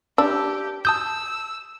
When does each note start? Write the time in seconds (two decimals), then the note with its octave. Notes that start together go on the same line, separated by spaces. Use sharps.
0.18 D4 G4 E6
0.85 A5 D#6 E6 G6